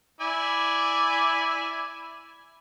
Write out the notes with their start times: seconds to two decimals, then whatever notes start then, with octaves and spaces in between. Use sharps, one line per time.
0.21 E4 D5 G#5